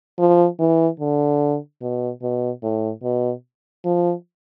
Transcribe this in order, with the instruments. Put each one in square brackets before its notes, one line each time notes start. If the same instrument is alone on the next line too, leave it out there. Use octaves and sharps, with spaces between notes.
[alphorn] F3
E3
D3
B2
B2
A2
B2
F3